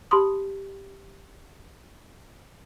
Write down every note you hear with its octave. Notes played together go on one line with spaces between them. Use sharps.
G4 A5 B5 C6 D#6